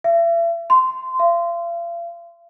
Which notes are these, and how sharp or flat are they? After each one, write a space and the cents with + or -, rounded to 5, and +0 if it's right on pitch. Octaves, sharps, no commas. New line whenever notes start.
E5 +40
C6 -20
F5 -40